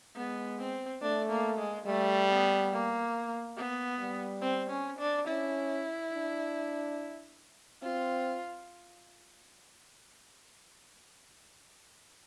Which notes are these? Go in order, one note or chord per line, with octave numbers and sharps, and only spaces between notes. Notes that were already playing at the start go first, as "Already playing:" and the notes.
G#3 B3
C4
A3 D4
A#3
G#3
G3 A3
B3
A#3
B3
G3
C4
C#4
D4
C#4 E4
D4
C4 F4